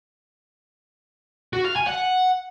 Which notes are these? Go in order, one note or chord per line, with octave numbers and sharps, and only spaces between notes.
F#4
F5
G#5
F#5